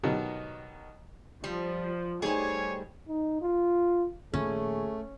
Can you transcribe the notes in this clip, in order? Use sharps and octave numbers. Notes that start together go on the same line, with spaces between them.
B2 D#3 F#3 B3 F#4 G4
F3 G3
G3 A3 D#4 G4 G#4 C5 C#5 G#5
D#4
F4
A#2 D#3 F3 A3 C#4 G#4